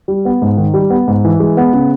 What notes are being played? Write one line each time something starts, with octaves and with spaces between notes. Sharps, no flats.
G3
B3
G#2
D#3
G3
B3
G#2
E3
G#3
B3
C#3